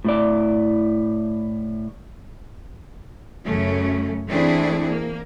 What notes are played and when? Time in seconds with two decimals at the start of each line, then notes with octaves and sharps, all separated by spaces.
0.05 A2 E4 D5
3.44 F#2 C#3 A3 C#4
4.27 E3 A3 C4 D4 E4 G#4
4.88 A#3